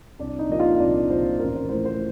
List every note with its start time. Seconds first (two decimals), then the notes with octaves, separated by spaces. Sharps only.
0.19 C2 D4 D5
0.39 D#4 D#5
0.49 A#2 F3 A#3 D#5
0.59 F4 F5
0.79 C2 D4 D5
1.09 A#2 F3 A#3 C5
1.39 A1 A#4
1.55 C5
1.69 A2 F3 A3 C5
1.85 C5